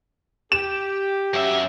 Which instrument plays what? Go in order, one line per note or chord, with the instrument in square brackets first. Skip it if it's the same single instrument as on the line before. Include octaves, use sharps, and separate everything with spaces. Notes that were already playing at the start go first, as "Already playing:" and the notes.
[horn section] G4 [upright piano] E7
[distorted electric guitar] F#2 E5